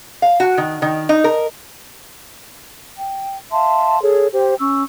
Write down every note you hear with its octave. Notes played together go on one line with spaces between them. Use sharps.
F5
F#4
D#3
D#3
D#4
A#4
G5
E5 F5 A5 C6
G#4 A4 C#5
G4 C5 G5
C#4 C#6 E6